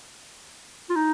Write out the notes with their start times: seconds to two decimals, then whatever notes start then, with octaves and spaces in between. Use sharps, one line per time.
0.90 F4
0.96 D#4